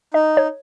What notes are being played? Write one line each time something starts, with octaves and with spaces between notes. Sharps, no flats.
D#4 D#5
C#5